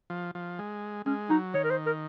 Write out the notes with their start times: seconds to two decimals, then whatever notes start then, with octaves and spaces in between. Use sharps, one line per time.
0.10 F3
0.35 F3
0.59 G#3
1.06 G#3 C#4
1.30 F#3 D#4
1.54 D#3 C#5
1.64 A#4
1.71 C5
1.86 A#4